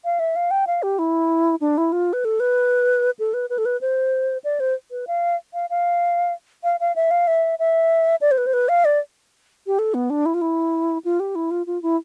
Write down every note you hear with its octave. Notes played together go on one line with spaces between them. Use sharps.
F5
E5
F5
G5
F5
G4
E4
D4
E4
F4
B4
A4
B4
A4
B4
B4
A4
B4
C5
D5
C5
B4
F5
F5
F5
F5
F5
E5
F5
E5
E5
D5
C5
B4
C5
B4
F5
D5
G4
A4
B3
D4
E4
F4
E4
F4
G4
E4
F4
F4
E4